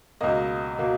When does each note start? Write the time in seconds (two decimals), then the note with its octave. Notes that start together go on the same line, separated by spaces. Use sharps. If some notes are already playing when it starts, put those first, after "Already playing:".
0.21 C#2 B2 A#3 D#5
0.78 B2 A#3